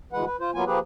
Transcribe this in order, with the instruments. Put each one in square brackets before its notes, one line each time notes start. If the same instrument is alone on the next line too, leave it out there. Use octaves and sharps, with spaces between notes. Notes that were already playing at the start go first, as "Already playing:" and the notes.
[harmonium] D2 E3 G#3 B4 F#5
B4
F4 C5
F#3 A#3 B3 F4 G#5
F3 A#3 G4 G#4 B4